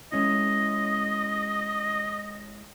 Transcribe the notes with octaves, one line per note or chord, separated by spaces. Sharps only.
G#3 C#4 E4 D#5